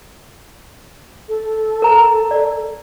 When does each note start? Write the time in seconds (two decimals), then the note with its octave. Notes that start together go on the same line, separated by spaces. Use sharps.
1.29 A4
1.82 A#4 A#5
2.31 D5